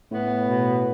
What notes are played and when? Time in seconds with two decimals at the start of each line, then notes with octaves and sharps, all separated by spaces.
0.11 A2 B3
0.47 B2